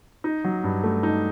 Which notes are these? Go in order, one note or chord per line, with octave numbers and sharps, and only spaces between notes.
D#4
F#3
G2
A3
D#4